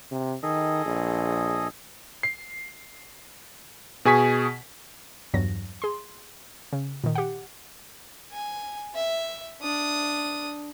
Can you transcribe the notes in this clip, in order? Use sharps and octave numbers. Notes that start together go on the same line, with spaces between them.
C3
D#3 G#4 A4 D#5
A#1
C7
B2 G#4 G#5 C#6 B6
E2 G2 F#3 A#6
G#4 C6
C#3
A#2 D#3
G4 F#5
G#5
E5
D4 D#6